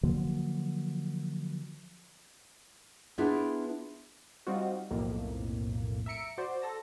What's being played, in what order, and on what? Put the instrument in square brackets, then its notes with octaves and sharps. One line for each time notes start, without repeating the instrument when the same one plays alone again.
[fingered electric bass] D3 F3 F#3 A#3
[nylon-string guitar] B3 D4 E4 F4 G#4 E5
[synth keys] G3 C4 D#4 F4 F#4
B1 F2 A2 A#3
E5 A#5 C#7 D7
F#4 C5 D5
A4 A5 A#6